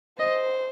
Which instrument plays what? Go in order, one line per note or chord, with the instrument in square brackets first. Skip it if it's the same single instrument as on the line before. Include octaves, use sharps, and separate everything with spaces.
[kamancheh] C5 [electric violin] D#5